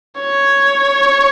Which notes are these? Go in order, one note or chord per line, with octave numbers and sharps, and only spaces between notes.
C#5